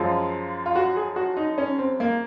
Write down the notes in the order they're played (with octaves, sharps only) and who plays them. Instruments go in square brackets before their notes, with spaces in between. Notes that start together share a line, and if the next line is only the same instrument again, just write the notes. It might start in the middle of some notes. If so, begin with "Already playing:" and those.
Already playing: [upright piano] F#2 F3 G#3 F4
F4
F#4
G#4
F#4
D#4
C#4
C4
A#3